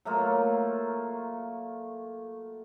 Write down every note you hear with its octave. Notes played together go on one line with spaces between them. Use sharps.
F#3 A3 A#3 F4